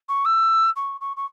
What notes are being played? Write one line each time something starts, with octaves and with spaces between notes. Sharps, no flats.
C#6
E6
C#6
C#6
C#6